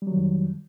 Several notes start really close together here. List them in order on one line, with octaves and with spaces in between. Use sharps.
G3 F#3 D#3 F2